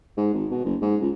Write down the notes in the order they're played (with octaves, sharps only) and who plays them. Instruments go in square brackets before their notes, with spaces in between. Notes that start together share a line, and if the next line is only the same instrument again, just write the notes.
[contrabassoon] G#2
G#1
B2
F#1
G#2
C#2